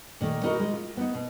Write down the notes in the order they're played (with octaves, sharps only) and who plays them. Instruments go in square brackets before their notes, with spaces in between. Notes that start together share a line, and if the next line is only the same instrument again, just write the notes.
[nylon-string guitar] A#2 D#3 A3
D#4 E4 F#4 A#4 D#5
G#3
F4
B3 D#4
B2